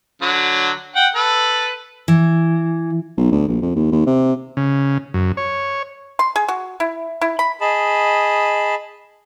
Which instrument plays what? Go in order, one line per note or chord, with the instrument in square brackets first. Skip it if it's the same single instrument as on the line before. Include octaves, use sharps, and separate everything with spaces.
[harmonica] D3 F#3
F#5 G5
A4 B4
[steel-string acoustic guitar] E3
[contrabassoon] B1
D2
A#1
F2
D#2
D#2
C3
[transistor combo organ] C#3
F#2
C#5
[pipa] C6
G#4
F#4
E4
E4
B5
[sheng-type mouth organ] G#4 D#5 A5 B5